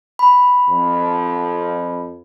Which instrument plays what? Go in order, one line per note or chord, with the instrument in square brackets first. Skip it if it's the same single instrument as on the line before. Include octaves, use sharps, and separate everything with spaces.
[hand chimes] B5
[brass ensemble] F2